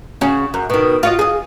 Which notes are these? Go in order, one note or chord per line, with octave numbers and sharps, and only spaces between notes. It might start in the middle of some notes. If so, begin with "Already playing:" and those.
C#3 C#4 F#4
F#2
B2 D#3
F4 F#4 D#5
G#4 D#5